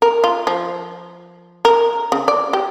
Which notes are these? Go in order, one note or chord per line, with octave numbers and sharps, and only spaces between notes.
A#4
F4
F3
A#4
C#3
D5
G4